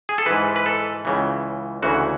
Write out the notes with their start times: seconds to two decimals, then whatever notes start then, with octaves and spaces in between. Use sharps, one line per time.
0.09 G#4
0.18 A4
0.26 G#2 E3 B4
0.56 B4
0.66 A4
1.05 C#2 C#3 E3
1.82 D2 C#3 E3 F#4